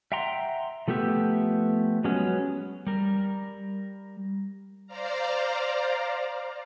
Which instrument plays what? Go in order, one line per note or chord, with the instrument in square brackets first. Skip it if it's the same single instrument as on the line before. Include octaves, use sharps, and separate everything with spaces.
[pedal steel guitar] E5 F#5 G5 A#5 C6
F3 A3 B3 G4 E5
F#3 G#3 B3 C#4
[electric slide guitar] G3 A#4
[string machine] C5 D5 F5 A#5